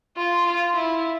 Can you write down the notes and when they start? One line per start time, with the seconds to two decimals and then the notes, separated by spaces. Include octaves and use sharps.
0.17 F4
0.46 F4
0.75 E4